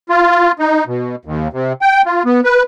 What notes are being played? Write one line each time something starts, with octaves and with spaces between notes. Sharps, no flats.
F4
D#4
B2
D#2
C3
G5
F4
B3
B4